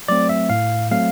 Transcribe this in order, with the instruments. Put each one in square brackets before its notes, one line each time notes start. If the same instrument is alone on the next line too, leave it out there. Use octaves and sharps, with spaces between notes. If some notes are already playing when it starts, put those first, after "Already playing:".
[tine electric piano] F#3 A3 C4 D5
E5
A2 F5
F#3 A3 C4 F5